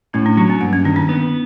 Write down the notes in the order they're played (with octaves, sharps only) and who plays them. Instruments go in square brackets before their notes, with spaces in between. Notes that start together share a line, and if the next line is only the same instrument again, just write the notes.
[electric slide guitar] A2 [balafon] C#4
[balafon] D4
[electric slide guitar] F#3 [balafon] D4
[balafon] C4
[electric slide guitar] G2 [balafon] A#3
[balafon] C#4
[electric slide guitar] D#3 [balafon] D4
[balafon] D#4
[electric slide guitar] B3